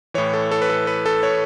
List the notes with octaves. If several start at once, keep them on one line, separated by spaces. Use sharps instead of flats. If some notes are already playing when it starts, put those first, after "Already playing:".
A2 E3 C#5
A4
A4
B4
A4
B4
A4
C#5